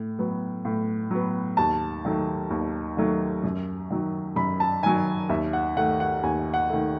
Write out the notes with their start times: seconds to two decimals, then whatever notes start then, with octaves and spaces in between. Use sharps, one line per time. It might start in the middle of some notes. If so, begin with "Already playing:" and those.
Already playing: A2
0.19 F#3 B3
0.65 A2
1.11 F#3 B3
1.57 D#2 A5
2.05 D#3 F#3 A3
2.50 D#2
2.97 D#3 F#3 A3
3.44 F#2
3.90 D#3 F#3
4.36 F#2 B5
4.60 A5
4.83 D#3 F#3 G#5
5.29 D#2 E5
5.53 F#5
5.77 D#3 A3 F#5
6.00 F#5
6.23 D#2 G#5
6.54 F#5
6.70 D#3 A3